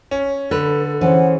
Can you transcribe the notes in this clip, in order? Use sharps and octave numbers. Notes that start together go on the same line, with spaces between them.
C#4
D3 A4 B4
E3 C#4 G#4 C5 F#5